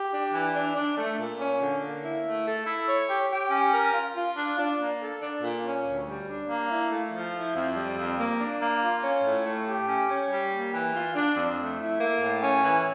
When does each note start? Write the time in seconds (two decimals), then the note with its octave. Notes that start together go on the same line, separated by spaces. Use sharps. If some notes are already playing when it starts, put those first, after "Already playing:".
Already playing: G4
0.11 D4
0.33 E3
0.54 D4
0.75 D4
0.96 A3
1.18 A#2
1.39 C#4
1.60 D3
1.81 A#3
2.02 E4
2.24 A3
2.45 A4
2.66 E4
2.87 C#5
3.09 G4
3.30 G4
3.50 C#4
3.72 A#4
3.93 F4
4.15 F4
4.36 D4
4.57 D4
4.79 A#3
4.99 A4
5.21 D4
5.42 A#2
5.63 C#4
5.84 D2
6.06 G3
6.26 D4
6.48 A#3
6.69 E4
6.91 A3
7.11 F3
7.33 E4
7.54 F2
7.75 G3
7.97 F2
8.18 A#3
8.39 D4
8.60 A#3
8.81 F4
9.03 C#4
9.23 A2
9.46 A3
9.66 G4
9.87 C#4
10.09 C#4
10.30 G3
10.51 A#3
10.73 E3
10.94 F4
11.15 D4
11.36 F2
11.58 A3
11.78 E4
11.99 A#3
12.20 A2
12.42 C#4
12.63 E3